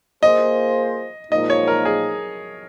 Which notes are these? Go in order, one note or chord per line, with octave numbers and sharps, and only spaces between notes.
A#3 F4 G#4 C5 D#5
A#2 F3 G#3 D#4 D#5
C#5
A#4
G#4